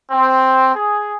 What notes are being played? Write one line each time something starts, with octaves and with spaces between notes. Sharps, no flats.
C4
G#4